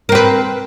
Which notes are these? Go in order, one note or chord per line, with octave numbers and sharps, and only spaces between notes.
C4 A#4 B4